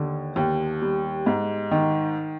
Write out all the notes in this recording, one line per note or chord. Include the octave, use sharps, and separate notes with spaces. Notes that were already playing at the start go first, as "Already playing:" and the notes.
Already playing: D#2 D3
D#2
G3
G#2
D#3